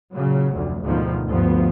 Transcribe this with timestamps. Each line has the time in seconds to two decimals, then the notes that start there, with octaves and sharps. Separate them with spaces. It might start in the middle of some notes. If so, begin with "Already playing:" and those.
0.13 A#2 C#3 F#3
0.53 F1 D2
0.82 D2 G#2 B2 D#3 F3
1.26 D2 G2 F3 B3